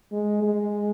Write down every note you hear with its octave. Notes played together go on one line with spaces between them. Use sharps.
G#3
G#3